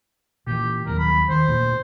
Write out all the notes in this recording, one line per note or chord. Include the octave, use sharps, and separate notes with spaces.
A#2 E3 G4
D#2 F#3 G3 A#4
B5
D#3 C5
D2 G2 A#2